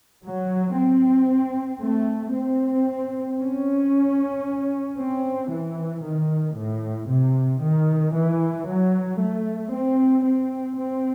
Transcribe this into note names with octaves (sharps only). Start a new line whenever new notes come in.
F#3
C4
A3
C4
C#4
C4
E3
D#3
A2
C3
D#3
E3
F#3
A3
C4
C4
C4